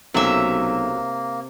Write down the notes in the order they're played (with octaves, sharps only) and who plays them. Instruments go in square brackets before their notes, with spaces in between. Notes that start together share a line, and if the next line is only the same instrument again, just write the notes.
[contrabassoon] B1 [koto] C3 E5 [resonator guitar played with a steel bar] F#3 A3 C#4 [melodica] A#3